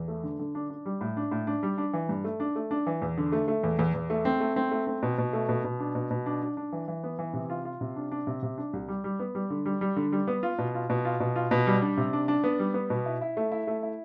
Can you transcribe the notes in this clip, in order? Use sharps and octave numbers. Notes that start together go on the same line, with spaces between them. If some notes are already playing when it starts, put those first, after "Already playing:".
Already playing: E2
A3
D3
D3
D4
D4
G3
A2
D4
A2
D4
G3
D4
E3
G2
A3
D4
A3
D4
E3
E2
D3
A3
A3
E2
E2
E2
A3
C4
A3
C4
A3
C4
B2
B2
A3
B2
B2
D4
B2
B2
D4
D4
D4
E3
E3
B3
E3
C3
F4
F4
C3
D4
D4
C3
C3
D4
C2
G3
G3
B3
G3
D3
G3
G3
D3
G3
B3
F4
B2
F4
B2
F4
B2
F4
B2
G3
D4
C3
D4
D4
B3
G3
B3
B2
E4
E4
A3
E4
A3
E4